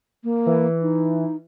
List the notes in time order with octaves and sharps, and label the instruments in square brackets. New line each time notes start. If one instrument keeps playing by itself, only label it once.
[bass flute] A#3
[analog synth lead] E3
[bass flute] D#4